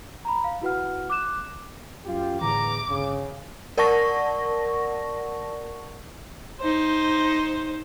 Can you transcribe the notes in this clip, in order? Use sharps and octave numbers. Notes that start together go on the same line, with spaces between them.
A#5 B5
F5
E4 F#4 B4 F#5 F6
D6 F#6 E7
F#2 F4 G4
E2 A2 D3 E3 A#5 D6
G1 G2 C#3
A#4 D5 F#5 A5 C#6 A#6
D#4 C5